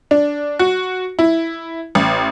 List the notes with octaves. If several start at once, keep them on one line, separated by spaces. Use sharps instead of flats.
D4
F#4
E4
A1